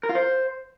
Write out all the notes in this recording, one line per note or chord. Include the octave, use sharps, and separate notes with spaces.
A#4
F4
C5